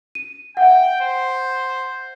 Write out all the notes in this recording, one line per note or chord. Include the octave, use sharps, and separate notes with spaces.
D#7
E5 F#5 G5
C5